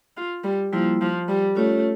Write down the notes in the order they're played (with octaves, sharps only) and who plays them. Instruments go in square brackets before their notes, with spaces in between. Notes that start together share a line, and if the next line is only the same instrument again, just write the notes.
[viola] F4
G3
[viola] F3 [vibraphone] G3 A#3 E4
[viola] F3
G3
[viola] A3 [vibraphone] C#4 F4 C#5